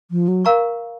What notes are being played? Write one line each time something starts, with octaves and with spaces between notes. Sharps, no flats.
F3
F#3
A#4 F5 A#5 C#6